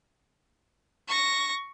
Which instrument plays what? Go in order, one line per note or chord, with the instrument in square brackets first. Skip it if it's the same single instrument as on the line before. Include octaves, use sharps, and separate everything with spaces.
[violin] C#6 A#6